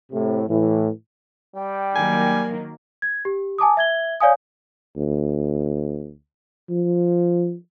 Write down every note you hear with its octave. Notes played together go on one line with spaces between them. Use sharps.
A2 C3
A2 E3
G3 G5
D#3 F#3 A#3 G#5
G#6
G4
G#5 A5 D6 D#6
E5 G#6 G7
C#5 D5 F5 G#5 D#6
D2
F3